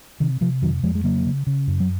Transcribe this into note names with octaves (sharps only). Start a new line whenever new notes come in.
C3 D#3
C3 F3
F2 D#3 F#3
F2 F3 G#3
G#3
C#3 F#3 A#3
C#3
C#3
F#2
F#3